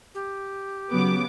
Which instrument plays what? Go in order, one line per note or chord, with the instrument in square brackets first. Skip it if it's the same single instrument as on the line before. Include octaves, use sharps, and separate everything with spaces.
[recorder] G4
[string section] C#3 B3 D6 [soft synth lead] F#3